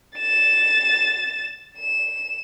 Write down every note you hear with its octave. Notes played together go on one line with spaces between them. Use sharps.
A6 E7
E7